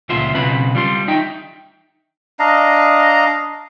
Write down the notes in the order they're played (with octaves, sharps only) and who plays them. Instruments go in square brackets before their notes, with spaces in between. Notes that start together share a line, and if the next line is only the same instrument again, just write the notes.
[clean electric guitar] C#2 A#2 B3 F4 E5 C6
B1 C#3 C4 B4 B5
G3 F4 C6
D#4 E5 G5
[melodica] D4 D#5 F5 A#5